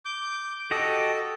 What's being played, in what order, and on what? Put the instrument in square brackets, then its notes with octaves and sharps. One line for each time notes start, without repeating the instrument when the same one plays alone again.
[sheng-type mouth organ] D6 G6
[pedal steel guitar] F#4 G4 D#5 [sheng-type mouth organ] A4